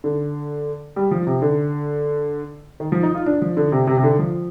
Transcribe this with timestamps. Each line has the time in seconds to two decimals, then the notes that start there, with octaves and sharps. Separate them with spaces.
0.04 D3
0.96 G3
1.11 F3
1.27 C3
1.42 D3
2.80 D#3
2.92 F3
3.03 D#4
3.15 F4
3.26 D4
3.42 F3
3.57 D3
3.72 C3
3.87 C3
3.97 C3
4.04 D3
4.19 F3